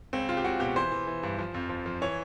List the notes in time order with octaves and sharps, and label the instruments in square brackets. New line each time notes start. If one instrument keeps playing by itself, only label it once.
[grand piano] C#2 C4
C#2 F4
G4
C#2 F#4
B2 G4
E3 C5
E3
E3
G2
F3
F2
F3
F3
E3 C#5